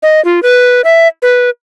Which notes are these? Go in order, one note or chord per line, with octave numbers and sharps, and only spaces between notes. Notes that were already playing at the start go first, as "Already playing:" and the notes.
D#5
F4
B4
E5
B4